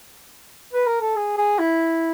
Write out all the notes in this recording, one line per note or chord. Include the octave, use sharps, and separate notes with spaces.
B4
A#4
A4
G#4
G#4
E4